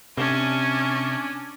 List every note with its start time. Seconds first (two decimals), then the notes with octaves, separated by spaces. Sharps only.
0.17 C3 C#4 D4 G#5